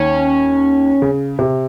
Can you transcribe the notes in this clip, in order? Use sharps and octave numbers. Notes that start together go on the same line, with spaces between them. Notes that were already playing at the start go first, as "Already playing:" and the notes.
Already playing: D#2 D#3 C#4
C#3
C3